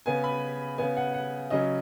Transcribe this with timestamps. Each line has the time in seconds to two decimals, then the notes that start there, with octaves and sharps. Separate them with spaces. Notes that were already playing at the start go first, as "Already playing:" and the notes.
0.06 C#3 B3 G#5
0.24 B5
0.78 C#3 B3 G#5
0.97 F#5
1.14 F#5
1.50 C#3 F#3 C#4 D#5